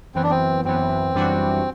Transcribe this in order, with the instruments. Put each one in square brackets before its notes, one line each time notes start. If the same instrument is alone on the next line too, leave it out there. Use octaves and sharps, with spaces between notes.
[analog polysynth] F#2 E3 B3 [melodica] C4
[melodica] D4
C4
[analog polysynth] F#2 E3 B3 [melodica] C4
[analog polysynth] F#2 E3 G3 D4 F#4